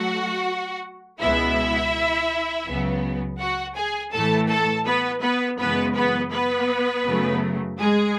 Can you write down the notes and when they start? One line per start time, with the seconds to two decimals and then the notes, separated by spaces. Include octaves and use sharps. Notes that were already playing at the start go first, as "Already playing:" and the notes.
Already playing: F#3 A3 F#4 F#5
1.20 C#2 B2 G#3 B3 E4 E5
2.66 C#2 C#3 F#3 B3
3.39 F#4 F#5
3.76 G#4 G#5
4.12 A2 E3 A3 A4 A5
4.49 A4 A5
4.86 B3 B4
5.22 B3 B4
5.58 F#2 C#3 E3 G#3 B3 B4
5.96 B3 B4
6.32 B3 B4
7.05 F#2 C#3 F#3 A3
7.78 G#3 G#4